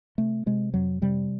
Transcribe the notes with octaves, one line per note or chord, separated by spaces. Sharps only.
C3 A3
C3 G#3
F2 F#3
C3 G3